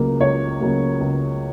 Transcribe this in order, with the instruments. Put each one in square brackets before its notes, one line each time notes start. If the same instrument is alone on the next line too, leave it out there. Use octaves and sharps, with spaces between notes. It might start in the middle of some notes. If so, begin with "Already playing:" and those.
Already playing: [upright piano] C#2 C#3 F#3 A#3
C#2 C#5
C#3 F#3 A#3
C#2